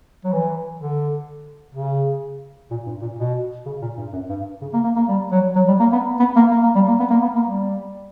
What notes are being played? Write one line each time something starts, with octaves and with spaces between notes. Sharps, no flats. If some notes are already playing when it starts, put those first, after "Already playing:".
F#3
E3
D3
C#3
A#2
G2
A#2
B2
C#3
A#2
G2
F#2
G2
C#3
A#3
A#3
A#3
G3
F#3
F#3
G3
A#3
B3
B3
A#3
A#3
A#3
G3
A#3
B3
A#3
B3
A#3
G3